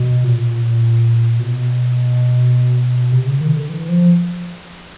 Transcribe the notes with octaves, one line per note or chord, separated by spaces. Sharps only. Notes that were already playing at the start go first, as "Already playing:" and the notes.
Already playing: B2
A#2
B2
C3
C#3
D#3
D3
E3
F3